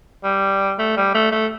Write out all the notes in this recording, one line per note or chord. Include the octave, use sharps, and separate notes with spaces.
G3
A3
G3
A3
A3